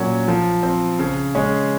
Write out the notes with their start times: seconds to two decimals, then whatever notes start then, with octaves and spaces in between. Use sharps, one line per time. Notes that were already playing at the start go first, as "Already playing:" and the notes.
Already playing: A#2 F#3 C#4
0.28 F3
0.63 C4
0.99 C#3
1.35 G#3 C#4